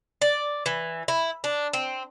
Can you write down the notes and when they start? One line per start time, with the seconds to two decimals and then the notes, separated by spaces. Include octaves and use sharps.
0.21 D5
0.66 E3
1.08 E4
1.44 D4
1.73 C4